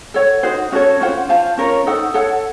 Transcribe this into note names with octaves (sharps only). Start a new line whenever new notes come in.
A4 C#5 F#5
D#4 F#4 C5
C#4 F#4 A4 C#5
C#4 F4 C5 F#5
F4 C5 F5 A5
C#4 F4 A#4 C#5
D#4 A4 C5 F#5
A4 C#5 F#5 A5